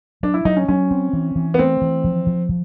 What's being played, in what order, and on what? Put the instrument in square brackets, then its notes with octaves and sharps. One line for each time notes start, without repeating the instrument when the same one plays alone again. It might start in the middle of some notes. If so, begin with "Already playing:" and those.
[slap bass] F#3 [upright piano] D4
[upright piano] E4
[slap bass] F#3 [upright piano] D#4
[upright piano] C#4
[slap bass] F#3 [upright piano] C#4
[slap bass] C4
E3
E3
[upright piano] B3
[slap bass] A3 [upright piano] C4
[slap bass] E3
F3
F3
F3